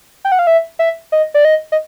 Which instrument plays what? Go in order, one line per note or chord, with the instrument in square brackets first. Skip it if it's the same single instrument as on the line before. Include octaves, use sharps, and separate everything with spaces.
[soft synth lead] G5
F#5
F5
E5
E5
D#5
D5
D#5
D#5